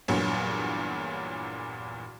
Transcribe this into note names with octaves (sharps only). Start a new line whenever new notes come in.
E2 G2 A#2 F#3